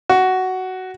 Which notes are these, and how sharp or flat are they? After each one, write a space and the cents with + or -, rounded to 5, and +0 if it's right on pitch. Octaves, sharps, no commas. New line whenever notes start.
F#4 +10